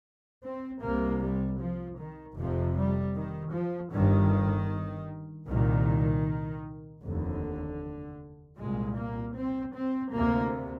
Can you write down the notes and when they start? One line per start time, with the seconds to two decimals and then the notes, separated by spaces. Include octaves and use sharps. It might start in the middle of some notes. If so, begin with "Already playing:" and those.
0.43 C4
0.81 C2 C3 A#3
1.21 G3
1.59 F3
1.98 D#3
2.37 F1 F2 C3 F3
2.76 G3
3.15 D#3
3.53 F3
3.92 G1 G2 D#3
5.47 C2 A#2 D#3
7.03 F1 D#2 D3
8.59 C2 A#2 G#3
8.97 A#3
9.36 C4
9.75 C4
10.14 D2 C3 A#3